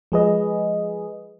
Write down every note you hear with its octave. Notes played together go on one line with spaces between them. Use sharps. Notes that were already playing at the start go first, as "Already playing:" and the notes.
F3 G#3 G#4 B4 D#5